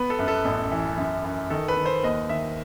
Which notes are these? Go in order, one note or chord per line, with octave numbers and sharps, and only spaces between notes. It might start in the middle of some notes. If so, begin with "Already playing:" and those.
Already playing: B3 B4
A4
F#2
A4
A1
E3
F#2
F#2
D#3 A4
B4
D#3
C5
D#2 D#5
D#3 E5